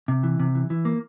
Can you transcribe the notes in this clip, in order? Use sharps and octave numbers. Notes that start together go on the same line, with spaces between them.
C3
E3
C3
E3
E3
A#3